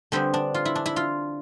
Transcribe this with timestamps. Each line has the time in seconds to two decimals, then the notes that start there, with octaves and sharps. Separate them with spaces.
0.12 D3 G3 B3 C4
0.34 D4
0.55 F4
0.65 E4
0.76 D4
0.86 E4
0.96 F4